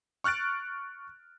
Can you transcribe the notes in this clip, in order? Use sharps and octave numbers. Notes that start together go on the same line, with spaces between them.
C#6 F6 F#6 A6 D7